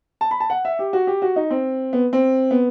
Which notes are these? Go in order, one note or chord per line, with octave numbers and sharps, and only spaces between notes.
A5
B5
A5
F#5
E5
G4
F#4
G4
F#4
D#4
C4
B3
C4
B3